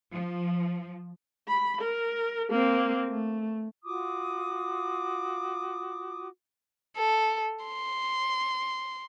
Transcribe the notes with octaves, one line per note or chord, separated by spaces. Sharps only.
F3
B5
A#4
A#3 C4
A3
F4 F#4 D6 D#6
A4
C6